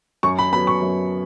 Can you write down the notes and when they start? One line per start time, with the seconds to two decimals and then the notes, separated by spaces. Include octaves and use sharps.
0.23 F#2 C#6
0.38 B5
0.53 F#3 B3 B5
0.67 C#6
0.82 F#2